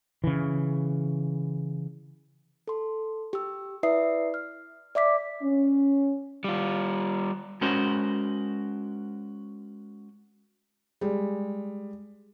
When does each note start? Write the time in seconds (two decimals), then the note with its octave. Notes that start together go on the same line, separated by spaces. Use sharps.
0.24 C#3 E3
2.68 A4 C6
3.33 G4 E6
3.83 E4 B4 D5 E5 D#6 C7
4.34 F6
4.95 D5 E5 D6 B6
5.42 C#4
6.44 G3 F4
7.61 G#3 C#4 F#4 A#4 C5
11.01 G3 G#3